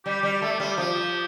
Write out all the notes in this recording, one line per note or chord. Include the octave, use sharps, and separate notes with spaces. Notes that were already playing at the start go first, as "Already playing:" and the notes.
G3 G4
G3
A3 A4
G4
G3 F4
G4
F3